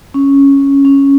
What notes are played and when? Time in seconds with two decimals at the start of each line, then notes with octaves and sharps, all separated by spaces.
0.14 C#4
0.85 C#4